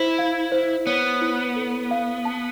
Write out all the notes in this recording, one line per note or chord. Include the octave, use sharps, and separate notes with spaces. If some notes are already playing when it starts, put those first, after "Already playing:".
Already playing: E4 C5
F5
C5
B3 C#5
E4
A4
F5
A5